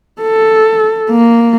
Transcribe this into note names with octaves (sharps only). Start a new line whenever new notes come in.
A4
A#3